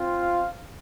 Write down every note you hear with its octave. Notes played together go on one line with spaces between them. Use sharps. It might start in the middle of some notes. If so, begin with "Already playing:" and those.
Already playing: C4 F4
F5